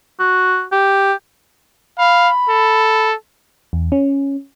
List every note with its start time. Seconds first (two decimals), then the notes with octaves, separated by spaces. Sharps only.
0.20 F#4
0.72 G4
1.98 F5 B5
2.49 A4
3.73 E2
3.92 C#4